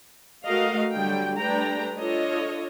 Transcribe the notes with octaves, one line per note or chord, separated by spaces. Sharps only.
A3 F#4 A#4 D#5 F5
D3 F#3 G3 G5
G3 A3 D4 B4 G5 A#5
D4 F4 A4 C#5 D#5